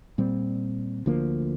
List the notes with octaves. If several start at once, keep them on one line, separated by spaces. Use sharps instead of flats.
A#2 G3 C4
D2 D3 F3 A#3